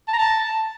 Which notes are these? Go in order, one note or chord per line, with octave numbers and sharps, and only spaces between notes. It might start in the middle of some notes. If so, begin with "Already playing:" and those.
A5
A#5
A5